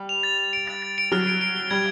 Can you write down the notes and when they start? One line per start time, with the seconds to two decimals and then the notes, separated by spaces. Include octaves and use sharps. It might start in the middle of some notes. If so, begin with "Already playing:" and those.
Already playing: G3
0.09 F7
0.23 A6
0.38 A6
0.53 D7
0.68 A6
0.82 A6
0.98 D7
1.12 F#3 F6
1.27 D7
1.41 D7
1.56 G7
1.70 G3 G#6